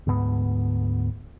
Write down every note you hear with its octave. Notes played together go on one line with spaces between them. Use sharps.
D2 G#2 B3